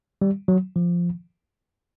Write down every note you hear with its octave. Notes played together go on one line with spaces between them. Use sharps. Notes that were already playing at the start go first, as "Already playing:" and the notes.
G3
F#3
F3